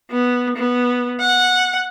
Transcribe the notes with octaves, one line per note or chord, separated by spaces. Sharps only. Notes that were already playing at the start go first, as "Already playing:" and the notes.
B3
B3
F#5